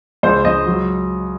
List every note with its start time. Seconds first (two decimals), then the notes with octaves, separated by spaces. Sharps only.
0.23 C#2 C5
0.45 C#2 D#5
0.66 F#3